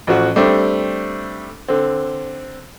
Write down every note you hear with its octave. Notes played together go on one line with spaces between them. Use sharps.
A1 F3 F#4
G3 A3 C4 D4
D3 C4